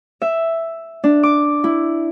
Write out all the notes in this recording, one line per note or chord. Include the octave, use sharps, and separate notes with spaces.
E5
D4
D6
E4